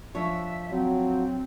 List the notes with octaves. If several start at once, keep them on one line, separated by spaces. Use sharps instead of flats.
F3 D4 C#5 E5
F#3 C4